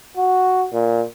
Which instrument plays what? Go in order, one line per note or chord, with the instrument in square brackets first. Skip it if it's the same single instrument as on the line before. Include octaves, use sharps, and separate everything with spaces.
[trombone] F#4
A#2